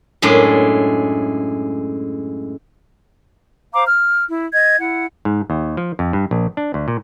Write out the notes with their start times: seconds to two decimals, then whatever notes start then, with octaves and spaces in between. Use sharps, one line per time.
0.22 F#2 A2 G#3 D4
3.74 C5 F5 A#5 D6
3.87 F6
4.27 E4
4.53 D#5 G#6
4.77 E4 F#5
5.25 G#2
5.50 D#2
5.77 F3
5.99 F2
6.13 G2
6.31 A#1
6.57 D4
6.74 D2
6.88 A#2